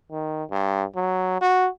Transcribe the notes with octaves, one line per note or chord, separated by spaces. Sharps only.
D#3
G2
F#3
F#4